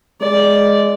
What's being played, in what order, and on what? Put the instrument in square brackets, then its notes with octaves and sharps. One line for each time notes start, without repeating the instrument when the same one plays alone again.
[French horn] G#3 [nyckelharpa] D5